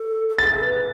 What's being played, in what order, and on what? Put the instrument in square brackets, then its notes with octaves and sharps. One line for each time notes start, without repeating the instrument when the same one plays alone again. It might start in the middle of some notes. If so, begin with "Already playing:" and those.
Already playing: [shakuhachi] A4
A4
[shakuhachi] G#4 [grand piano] A6
[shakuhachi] B4